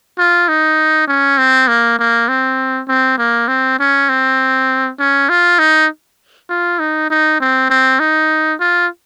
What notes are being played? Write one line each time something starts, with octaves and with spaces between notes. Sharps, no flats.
F4
D#4
C#4
C4
A#3
A#3
C4
C4
A#3
C4
C#4
C4
C#4
F4
D#4
F4
D#4
D#4
C4
C4
D#4
F4